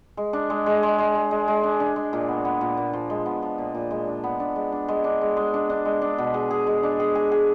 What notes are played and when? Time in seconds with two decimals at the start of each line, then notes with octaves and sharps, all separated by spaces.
0.17 G#3
0.33 D4
0.50 G#3
0.66 G#3
0.83 G#3
0.98 G#3
1.15 G#3
1.31 G#3
1.48 G#3
1.63 D4
1.80 D4
1.96 G#3
2.13 A#2
2.28 B3
2.45 B3
2.61 A#2
2.77 A#2
2.93 F3
3.10 G#3
3.26 B3
3.42 F3
3.58 A#2
3.75 A#2
3.91 G#3
4.07 D4
4.24 B3
4.40 D4
4.56 G#3
4.72 D4
4.88 G#3
5.04 D4
5.21 G#3
5.37 G#3
5.54 D4
5.69 D4
5.85 G#3
6.02 D4
6.18 B2
6.34 G#4
6.50 G#4
6.67 G#3
6.83 D4
7.00 G#4
7.15 G#4
7.32 G#4